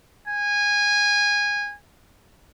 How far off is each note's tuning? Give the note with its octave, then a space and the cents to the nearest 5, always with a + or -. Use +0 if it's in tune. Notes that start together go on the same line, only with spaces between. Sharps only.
G#5 -20